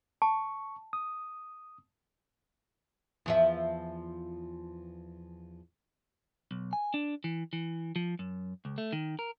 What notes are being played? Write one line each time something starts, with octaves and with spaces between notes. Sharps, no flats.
A5 C#6
D#6
E2 F3 E5
B1
G#5
D4
E3
E3
F3
F#2
C#2
A3
D#3
A#4